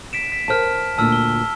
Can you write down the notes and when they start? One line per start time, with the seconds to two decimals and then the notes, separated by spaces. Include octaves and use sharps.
0.13 B6 D7 E7
0.32 B6
0.48 A#4 C5 F#5 A5 F6
0.98 D2 A#2 D4 A5 E6 F6
1.12 G7